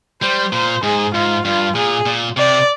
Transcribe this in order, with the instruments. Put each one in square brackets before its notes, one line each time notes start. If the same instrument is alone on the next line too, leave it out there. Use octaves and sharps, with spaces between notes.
[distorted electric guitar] G3 [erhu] C5
[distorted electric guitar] A#2 [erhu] C5
[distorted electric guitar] G#2 [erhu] G#4
[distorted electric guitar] G#2 [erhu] F4
[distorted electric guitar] G2 [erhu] F4
[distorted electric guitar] A#2 [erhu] G#4
[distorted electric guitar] A#2
[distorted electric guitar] C3 [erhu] D5